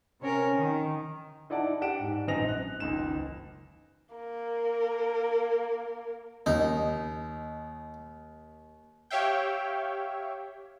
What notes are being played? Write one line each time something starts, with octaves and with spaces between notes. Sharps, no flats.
C3 C#4 A#4
D#3
D#4 E4 D5 F#5 A5
D4 G4 F#5 D7 E7
G#2
A#1 F#2 C4 D#4 A#6 F7
F#6
F#1 C#2 D#3 E7
A#3 A#4
D#2 D#4
G4 C#5 E5 F5 G5